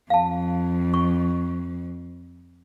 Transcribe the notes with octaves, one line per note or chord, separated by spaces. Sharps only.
F2 F5 A5
C#6